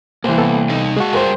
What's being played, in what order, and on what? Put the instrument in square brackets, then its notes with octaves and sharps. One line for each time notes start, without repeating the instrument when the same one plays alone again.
[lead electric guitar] C2 [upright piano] E3 C5 [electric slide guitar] A#3
[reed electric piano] B3 A4
[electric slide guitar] D#4 D#5 F5
[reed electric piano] G#3 F#4 [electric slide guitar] G#4 F5 A5
[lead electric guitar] C#2 G2 [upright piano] A#4 C5